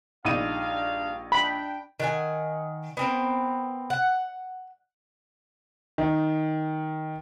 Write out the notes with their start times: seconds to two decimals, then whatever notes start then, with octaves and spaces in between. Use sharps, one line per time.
0.25 A#1 G2 D4 D#4 F5 D#7
1.32 D4 G5 B5
2.00 D#3 F#5 G#5
2.97 B3 C4 A#4
3.90 F#5
5.98 D#3